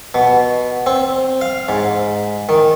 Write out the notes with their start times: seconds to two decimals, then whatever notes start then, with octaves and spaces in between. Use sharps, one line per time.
0.14 B2
0.86 C4
1.41 F5
1.69 G#2
2.49 D#3